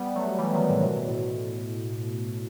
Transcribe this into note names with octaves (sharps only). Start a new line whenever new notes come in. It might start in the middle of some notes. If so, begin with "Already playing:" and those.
Already playing: G3 B3
F#3 A3
E3 G3
D#3 F#3
A2 C3
B2
A2